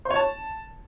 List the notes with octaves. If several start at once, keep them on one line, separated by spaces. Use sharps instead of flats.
C5
C#5
A5